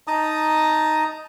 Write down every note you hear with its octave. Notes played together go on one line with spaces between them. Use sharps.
D#4 A5 A#5 D#6